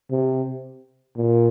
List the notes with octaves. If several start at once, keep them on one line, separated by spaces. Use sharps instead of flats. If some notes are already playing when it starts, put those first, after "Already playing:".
C3
A#2